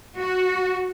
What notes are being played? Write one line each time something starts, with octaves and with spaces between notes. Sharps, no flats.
F#4